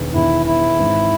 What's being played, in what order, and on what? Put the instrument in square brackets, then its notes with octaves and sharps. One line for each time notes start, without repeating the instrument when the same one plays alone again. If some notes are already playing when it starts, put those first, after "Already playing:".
Already playing: [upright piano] E1 E2 D#3
[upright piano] E1 E2 D#3 [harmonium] E4
[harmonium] E4
[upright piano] G#1 G#2 E3